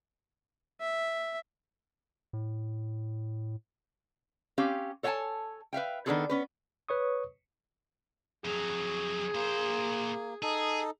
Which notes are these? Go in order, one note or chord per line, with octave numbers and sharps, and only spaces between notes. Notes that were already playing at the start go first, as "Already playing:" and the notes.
E5
A2
C4 C#4 G4 F5
A4 C#5 F5 F#5 G#5 A5
B4 E5 F5 G5
D#3 B3 D4 F4 G#4 A4
B3 C#4 B4
B4 C#5 C#6 D#6
F2 F#3 G#4
A#2 A#3 C5
D#4 G#4 A4